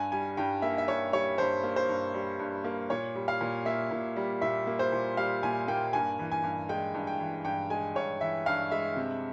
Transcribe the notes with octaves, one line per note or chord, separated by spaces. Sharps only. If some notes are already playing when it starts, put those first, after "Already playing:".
Already playing: G2 G#5
G3 G#5
G2 G5
A#3 E5
E5
G2 C#5
G3 C#5
G2 C5
A#3
C5
G2
G3
G2
A#3
A#2 C#5
G3
F5
A#2
A#3 E5
A#2
G3
A#2 E5
A#3
C5
A#2
G3 F5
A#2 G#5
A#3 G5
G2 G#5
E3
G#5
G2
G#3 G5
G2
G5
E3
G2 G5
G#3 G#5
G2 C#5
E3 E5
G2 F5
G#3 E5
C3